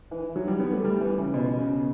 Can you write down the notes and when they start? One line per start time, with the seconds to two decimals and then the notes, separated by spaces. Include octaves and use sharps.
0.11 E3
0.36 F#3
0.48 G3
0.60 B3
0.72 A3
0.84 G3
1.01 E3
1.17 C#3
1.34 B2
1.58 C#3